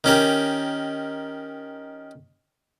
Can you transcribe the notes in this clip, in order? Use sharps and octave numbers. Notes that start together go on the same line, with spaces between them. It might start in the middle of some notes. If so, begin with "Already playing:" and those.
D#3 C#4 G4 A#4